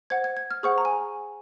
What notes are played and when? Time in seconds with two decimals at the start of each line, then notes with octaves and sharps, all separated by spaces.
0.10 C5 F#5 G#6
0.24 G#6
0.37 G#6
0.51 F6
0.63 G#4 C5 F#5 C#6
0.78 A#5
0.85 G#5